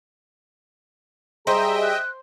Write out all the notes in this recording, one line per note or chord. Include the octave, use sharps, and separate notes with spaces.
G3 G#4 C5 D#5 E5 G5 A#5
F#6